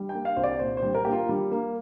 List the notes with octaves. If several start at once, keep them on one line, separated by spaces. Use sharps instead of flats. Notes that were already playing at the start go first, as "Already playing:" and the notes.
Already playing: G3
G5
A#3
F5
C2 C5
D5
A#2 C5
C5
G3
A#4
A#3 G4
F4
G3
A#3